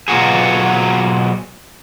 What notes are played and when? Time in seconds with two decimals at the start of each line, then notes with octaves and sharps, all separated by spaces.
0.08 B2 F#3 F4 F#4 G#4